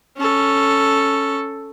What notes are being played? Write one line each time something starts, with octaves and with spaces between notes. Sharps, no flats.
C#4 A4